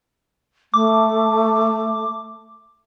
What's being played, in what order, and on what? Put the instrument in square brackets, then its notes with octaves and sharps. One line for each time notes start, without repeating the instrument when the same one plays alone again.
[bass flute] A3 [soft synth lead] D6